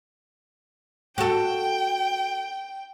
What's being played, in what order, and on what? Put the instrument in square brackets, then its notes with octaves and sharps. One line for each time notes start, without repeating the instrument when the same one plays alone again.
[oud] F#4 A4 [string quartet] G5